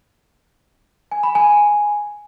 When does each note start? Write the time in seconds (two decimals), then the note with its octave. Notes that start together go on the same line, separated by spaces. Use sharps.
1.11 G#5
1.23 B5
1.35 G#5